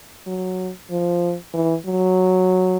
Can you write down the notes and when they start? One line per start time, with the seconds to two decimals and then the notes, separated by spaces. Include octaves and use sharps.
0.27 F#3
0.90 F3
1.54 E3
1.86 F#3